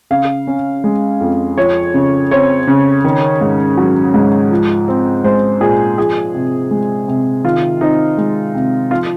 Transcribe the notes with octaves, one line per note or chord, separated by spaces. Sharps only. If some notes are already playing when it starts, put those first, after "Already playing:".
C#3 F5
C#4
G#3
F2
F3 C#5
C#3
C4 C#5
C#3
D#3
G#2
F#3
G#2
F3
C4
G#3 C5
A#2 G#4
F3 G#4
C3
G#3
C3
D#3 F4
C4 D#4
G#3
C3
F3 F4